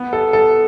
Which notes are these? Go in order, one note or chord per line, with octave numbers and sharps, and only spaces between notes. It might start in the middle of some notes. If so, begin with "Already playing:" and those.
Already playing: B3
A4
A4